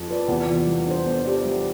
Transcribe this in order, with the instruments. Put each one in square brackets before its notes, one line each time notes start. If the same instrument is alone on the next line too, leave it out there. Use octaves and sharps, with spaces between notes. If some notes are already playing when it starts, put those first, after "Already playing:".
Already playing: [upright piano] F2
[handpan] F4 B4 D5
[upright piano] E2 [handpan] C3
[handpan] E3 B3 F4
G3
D4 A4 C5
B3
E4 G4 D5
G3